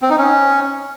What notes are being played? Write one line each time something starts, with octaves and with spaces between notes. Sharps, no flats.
C4
D#4
C#4